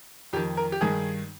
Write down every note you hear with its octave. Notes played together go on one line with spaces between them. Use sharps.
F2 D#3 G4
A#4
G4
G2 D#3 G#4